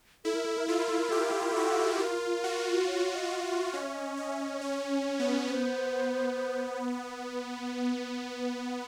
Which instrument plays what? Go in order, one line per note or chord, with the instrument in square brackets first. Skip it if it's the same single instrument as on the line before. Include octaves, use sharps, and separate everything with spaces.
[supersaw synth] E4 [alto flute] A4
[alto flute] A#4
A4
A#4
[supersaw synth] F4 [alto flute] A4
[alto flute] A#4
A4
A#4
[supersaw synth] G4 [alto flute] A4
[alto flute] A#4
A4
A#4
[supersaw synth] F#4 [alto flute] A4
[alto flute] A4
[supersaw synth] F4 [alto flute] A#4
[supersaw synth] F#4
[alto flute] C#5
D#5
[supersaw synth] F#4
[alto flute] E5
[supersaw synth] C#4 [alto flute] D#5
[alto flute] E5
D#5
[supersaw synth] C#4 [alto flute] D#5
[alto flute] E5
D#5
[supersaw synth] C#4 [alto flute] C#5
[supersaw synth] B3
[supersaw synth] B3 [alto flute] C5